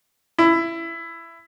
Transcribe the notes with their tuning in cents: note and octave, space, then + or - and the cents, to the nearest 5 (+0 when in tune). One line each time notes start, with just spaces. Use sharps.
E4 +15